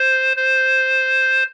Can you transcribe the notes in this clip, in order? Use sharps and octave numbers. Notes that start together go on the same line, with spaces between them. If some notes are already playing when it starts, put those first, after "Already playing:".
Already playing: C5
C5